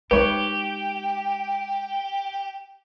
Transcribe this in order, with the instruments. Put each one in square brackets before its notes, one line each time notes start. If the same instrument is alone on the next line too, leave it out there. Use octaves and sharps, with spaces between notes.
[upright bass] G#3 D#4 [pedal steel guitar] G4 [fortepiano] B4 C#5 [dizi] G5